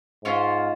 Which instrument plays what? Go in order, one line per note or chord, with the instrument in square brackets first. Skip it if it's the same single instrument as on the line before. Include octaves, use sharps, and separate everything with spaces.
[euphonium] G#2 [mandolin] C#4 F4 C5